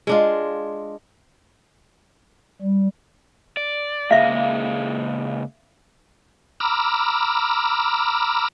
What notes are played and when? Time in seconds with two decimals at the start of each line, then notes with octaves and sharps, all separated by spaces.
0.07 G#3 D4 F4
2.61 G3
3.57 D5
4.11 C#3 G#3 A#3 E5 F5
6.60 A#5 B5 D6 E6 F6